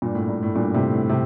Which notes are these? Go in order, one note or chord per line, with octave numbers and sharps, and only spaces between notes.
G2 A#2
A2
G2
A2
G2 A#2
A2 C3
A2
A2 C3